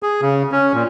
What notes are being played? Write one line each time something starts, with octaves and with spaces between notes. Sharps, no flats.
G#4
C#3
C#4
A#2